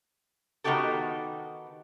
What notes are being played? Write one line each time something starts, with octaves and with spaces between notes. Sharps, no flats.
D#3 B3 D#4 F#4 G4 A4